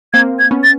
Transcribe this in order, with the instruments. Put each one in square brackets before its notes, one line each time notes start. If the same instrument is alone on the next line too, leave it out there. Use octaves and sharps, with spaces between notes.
[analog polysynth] A#3 C4 [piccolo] G#6
[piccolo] G#6
[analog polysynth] B3 C#4
[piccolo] A6